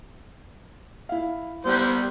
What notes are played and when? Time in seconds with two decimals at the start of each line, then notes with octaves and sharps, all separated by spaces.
1.09 E4 F5
1.65 G3 B3 C5 F#6